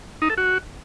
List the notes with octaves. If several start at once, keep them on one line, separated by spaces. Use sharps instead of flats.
D#4
A4
F#4